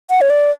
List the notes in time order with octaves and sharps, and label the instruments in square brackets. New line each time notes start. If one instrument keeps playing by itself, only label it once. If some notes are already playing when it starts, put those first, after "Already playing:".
[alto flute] F#5
C#5
D5